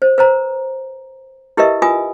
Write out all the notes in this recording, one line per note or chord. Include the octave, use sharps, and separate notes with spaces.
C5
B4 C5 A#5
E4 G4 A#4 B4 D#5 E5
F4 B4 G#5 D#6